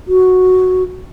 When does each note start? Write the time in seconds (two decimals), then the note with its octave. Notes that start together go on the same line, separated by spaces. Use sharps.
0.08 F#4